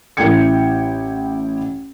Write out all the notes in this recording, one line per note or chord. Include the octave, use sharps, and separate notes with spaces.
A1 E4 G5 G#6 C#7